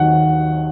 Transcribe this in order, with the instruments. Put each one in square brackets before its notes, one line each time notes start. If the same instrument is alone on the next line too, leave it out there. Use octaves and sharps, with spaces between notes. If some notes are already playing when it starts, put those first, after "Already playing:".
Already playing: [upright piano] D#2 D#3 F#3 F#5